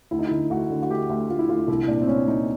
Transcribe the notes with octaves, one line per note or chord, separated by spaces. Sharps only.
D2 E4
D#4
D3 E4
D2 F#4
D3
F#4
D2 G4
D2
D2 F4
E4
D2 F4
C2 E4
A#2 D4
C4
A#2 C#4
A#2 D#4